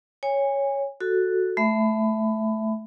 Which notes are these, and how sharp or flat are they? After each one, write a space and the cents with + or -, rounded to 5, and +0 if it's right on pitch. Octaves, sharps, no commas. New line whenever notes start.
C#5 +0 G#5 -25
F#4 +0 A4 +5
A3 -10 E5 +0 B5 +25